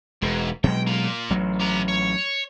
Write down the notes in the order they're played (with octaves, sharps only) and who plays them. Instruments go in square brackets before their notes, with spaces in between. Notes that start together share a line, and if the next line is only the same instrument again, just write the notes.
[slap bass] E1 [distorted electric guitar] G#2
[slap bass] B2 F#3 G#3 [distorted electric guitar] G5
[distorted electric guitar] A#3 F4
[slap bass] A1 F#3
[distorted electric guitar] G4 A#5
C#5